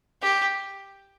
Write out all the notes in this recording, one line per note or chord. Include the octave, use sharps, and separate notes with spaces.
G4